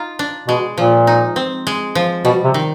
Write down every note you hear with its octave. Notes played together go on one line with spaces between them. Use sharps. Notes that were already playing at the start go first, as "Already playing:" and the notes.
Already playing: D#4 F4
D4
B2 G#3
A#2 F3
D#4
C4
G#3
F3
B2 G3
C3
D#3